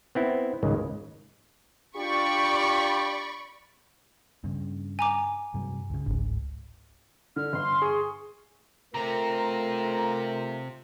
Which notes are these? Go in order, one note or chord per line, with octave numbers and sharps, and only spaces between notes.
B3 C4 E4
C#2 G#2 D#3 G#3
D4 F4 G4 D5 B5 C#6
G2 C#3
G#5 A#5 D6
G2 C3 F#3
C#2 C#3
G1 C#2 G#2
D3 F6
G1 C6
G#4 C#6
C3 A3 C4 F4 A#4 A#5